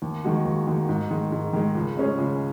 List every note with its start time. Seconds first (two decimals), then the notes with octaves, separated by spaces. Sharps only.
0.02 D#2
0.24 D#3 G#3 F#4
0.45 D#2
0.67 D#3 G#3 F#4
0.89 G#2
1.10 D#3 G#3
1.32 G#2
1.53 D#3 G#3
1.75 C#2
1.97 C#3 G#3 C#4 G#4
2.19 C#2